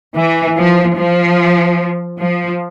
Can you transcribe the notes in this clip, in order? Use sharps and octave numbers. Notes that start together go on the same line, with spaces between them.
E3
F3
F3
F3